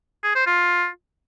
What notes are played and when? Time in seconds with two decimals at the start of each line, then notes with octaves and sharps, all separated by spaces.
0.23 G#4
0.35 C5
0.47 F4